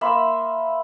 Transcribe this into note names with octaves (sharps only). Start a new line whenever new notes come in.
A#3 E5 B5 C6